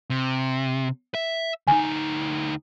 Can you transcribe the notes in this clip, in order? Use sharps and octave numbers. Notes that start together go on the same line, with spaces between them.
C3
E5
D2 D#4 G#5